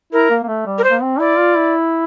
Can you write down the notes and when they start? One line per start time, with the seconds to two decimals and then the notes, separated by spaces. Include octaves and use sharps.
0.13 E4 A#4
0.30 A#3
0.43 A#3
0.48 A3
0.66 G3
0.78 A#4
0.84 C5
0.91 A#3
1.02 C4
1.19 E4 D5
1.38 F4
1.56 E4